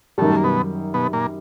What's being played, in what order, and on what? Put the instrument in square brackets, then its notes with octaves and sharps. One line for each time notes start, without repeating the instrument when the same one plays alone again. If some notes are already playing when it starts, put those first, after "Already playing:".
[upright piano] F#2 D#3 G3 [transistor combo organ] A2 A3
[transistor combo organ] A#3
B2 B3
B2 B3
A#2 A#3